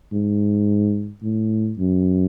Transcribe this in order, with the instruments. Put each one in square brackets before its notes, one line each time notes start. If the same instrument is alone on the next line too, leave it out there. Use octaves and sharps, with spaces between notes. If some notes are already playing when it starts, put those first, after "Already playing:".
[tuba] G#2
A2
F#2